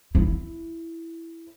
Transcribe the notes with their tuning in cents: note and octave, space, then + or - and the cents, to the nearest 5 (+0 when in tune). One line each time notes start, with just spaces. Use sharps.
E4 +5